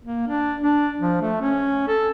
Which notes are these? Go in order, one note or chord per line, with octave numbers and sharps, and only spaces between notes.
A#3
D4
D4
F3
A3
C#4
A4